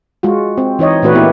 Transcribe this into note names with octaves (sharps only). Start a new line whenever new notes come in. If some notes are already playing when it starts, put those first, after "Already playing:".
G#3 F4 F#4
C4
E3 D#4 C#5 D#5
A#2 E3 A3 D4 F#4 B4
A#3 B3 E4 G4